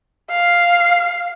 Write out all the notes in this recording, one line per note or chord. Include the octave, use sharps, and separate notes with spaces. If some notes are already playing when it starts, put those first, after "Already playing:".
F5